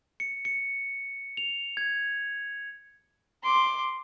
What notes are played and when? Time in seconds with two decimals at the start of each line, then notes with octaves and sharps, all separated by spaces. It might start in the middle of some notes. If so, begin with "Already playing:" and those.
0.20 C#7
0.45 C#7
1.37 F7
1.77 G#6
3.43 C6 D6